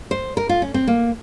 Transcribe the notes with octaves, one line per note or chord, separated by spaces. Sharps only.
C5
A#4
F4
C#4
C4
A#3